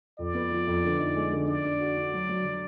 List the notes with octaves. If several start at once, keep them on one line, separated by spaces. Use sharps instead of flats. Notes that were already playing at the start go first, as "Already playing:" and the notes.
F2 D5
B3
F3
F2
D3
D#4
G#3
D3
D4 D5
D4
F#4
D4
F#3
F#3
F#3